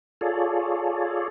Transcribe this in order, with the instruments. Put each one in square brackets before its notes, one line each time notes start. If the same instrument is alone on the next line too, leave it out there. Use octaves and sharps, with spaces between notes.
[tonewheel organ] F4 G#4 A4 C#5 D5